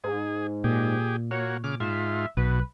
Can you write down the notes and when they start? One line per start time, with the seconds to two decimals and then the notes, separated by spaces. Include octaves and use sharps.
0.04 G#2 G#4
0.64 A#2 G4 G#4
1.31 A#3 F#4 C#5
1.64 C#3 D6 F6
1.80 G#2 F4 E5
2.37 B1 B2 B4